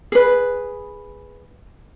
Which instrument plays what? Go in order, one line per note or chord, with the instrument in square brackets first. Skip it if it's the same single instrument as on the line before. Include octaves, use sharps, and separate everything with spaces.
[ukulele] G#4 B4